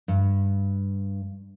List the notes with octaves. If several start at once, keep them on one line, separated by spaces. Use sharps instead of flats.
G2